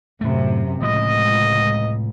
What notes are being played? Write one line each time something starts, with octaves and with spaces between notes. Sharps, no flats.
F#2 A2 C3 A3
C#2 A2 C3 F3 D#5